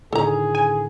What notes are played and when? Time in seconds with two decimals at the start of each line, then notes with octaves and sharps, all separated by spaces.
0.13 A2 D3 D#3 G#4 A4 A#5
0.55 G#5